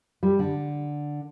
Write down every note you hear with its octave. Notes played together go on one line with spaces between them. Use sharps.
G3
D3